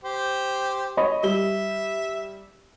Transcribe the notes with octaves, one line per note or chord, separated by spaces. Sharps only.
G4 C5
C#5 D#5 B5
G3 E5 G7